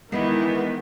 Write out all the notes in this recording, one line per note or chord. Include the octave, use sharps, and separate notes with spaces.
D#3 E3 G#3 B3 D#4 E4 A#4